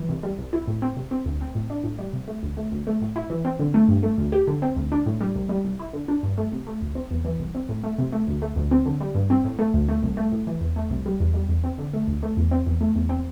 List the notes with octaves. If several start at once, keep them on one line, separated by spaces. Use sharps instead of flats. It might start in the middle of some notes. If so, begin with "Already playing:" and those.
Already playing: E3
C2
G3
C2
E4
A2
C4
C3
C4
D2
C4
A2
D4
A2
G3
C3
A3
D2
A3
D2
A3
A2
E4
E3
C4
D3
A3
G2
A3
D2
G4
D3
C4
D2
D4
A2
G3
C2
G3
C2
E4
D3
D4
G2
A3
C3
A3
D2
C4
E2
E3
C2
C4
A2
A3
C3
A3
D2
A3
D2
C4
D3
G3
G2
C4
A2
A3
D2
A3
C2
A3
A2
E3
E2
A3
C2
G3
E2
G3
E2
C4
D3
A3
D2
A3
E2
C4
E2
A3
E2
C4